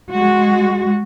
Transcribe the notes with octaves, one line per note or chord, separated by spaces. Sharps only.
G#3 F#4